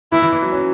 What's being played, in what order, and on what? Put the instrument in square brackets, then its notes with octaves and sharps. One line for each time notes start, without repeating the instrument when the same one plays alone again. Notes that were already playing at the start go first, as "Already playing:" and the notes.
[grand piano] E3 [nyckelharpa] E4
[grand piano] E3
E3
F#3
C#4